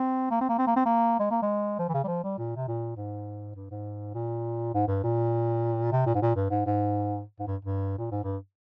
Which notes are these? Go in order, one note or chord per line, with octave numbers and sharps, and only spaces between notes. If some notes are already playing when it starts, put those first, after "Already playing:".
Already playing: C4
A#3
C4
A#3
C4
A#3
C4
A#3
G#3
A#3
G#3
F3
E3
C#3
G3
F3
G3
A#2
C3
A#2
G#2
G2
G#2
A#2
G#2
G2
A#2
C3
A#2
G#2
A#2
G2
G#2
G#2
G#2
G2
G2
A#2
G#2
G2